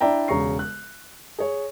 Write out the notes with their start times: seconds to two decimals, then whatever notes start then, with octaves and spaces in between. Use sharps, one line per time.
0.01 D4 E4 D5 E5 G5 A#5
0.28 E1 C#3 A#5 C#6 C7
0.59 F#6
1.38 G#4 C#5